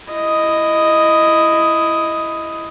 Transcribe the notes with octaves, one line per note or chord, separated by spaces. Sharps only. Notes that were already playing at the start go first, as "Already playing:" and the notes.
E4 D#5